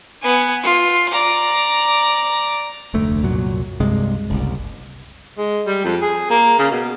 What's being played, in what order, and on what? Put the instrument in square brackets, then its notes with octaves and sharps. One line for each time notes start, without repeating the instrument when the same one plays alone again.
[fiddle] B3 G#5
F4
D5 A#5
[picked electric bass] F1 D2 A3
C2 F#2 A#2 F#3
C2 G2 C3 G#3
F#1 C2
[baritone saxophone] G#3
G3
F2
G#4
A#3
C#3
B2